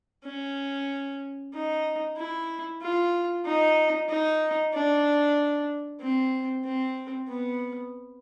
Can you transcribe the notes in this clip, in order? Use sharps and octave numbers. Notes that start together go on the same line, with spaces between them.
C#4
D#4
E4
F4
D#4
D#4
D4
C4
C4
B3